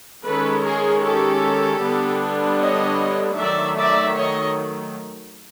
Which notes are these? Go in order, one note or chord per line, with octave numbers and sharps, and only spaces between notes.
D#3 G#3 C#4 A4 B4
G#4 A#4
G4 A4
D3 G3 B3 D4
C#5 D#5
D#3 F#3 A3 D5 E5
D5 E5
C#5 D#5